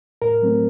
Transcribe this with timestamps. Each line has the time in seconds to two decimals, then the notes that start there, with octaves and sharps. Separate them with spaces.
0.22 A2 A#4
0.42 F#3 A3 C4